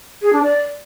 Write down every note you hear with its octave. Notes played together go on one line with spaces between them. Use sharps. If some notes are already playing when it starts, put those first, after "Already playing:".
G#4
D4
D5